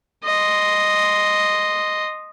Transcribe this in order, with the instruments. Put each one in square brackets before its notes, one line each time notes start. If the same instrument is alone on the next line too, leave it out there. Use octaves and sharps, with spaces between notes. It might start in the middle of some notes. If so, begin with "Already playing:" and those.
[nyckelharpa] D#5 C6